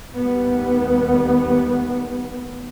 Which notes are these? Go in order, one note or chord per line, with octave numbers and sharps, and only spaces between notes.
D#2 G3 A3 B3